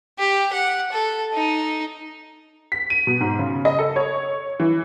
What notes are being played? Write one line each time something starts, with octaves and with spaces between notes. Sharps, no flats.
G4
F#5
A4
D#4
B6
D#7
B2
G#2
C#3
D#5
A4
C#5
E3